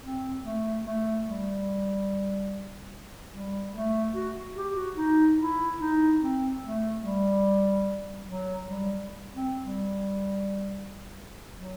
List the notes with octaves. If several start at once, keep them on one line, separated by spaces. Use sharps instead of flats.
C4
A3
A3
G3
G3
A3
F#4
G4
F#4
D#4
E4
D#4
C4
A3
G3
F#3
G3
C4
G3
F#3